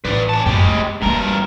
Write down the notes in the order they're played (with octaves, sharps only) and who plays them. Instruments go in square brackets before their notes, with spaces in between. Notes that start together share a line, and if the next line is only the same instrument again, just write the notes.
[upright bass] A1 [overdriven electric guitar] B4 D5
[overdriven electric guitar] C#4 A5
[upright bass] F#2 B3 [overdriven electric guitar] G#3 G4
[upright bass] A3
[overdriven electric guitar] G2 A#4 [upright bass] G3 A#3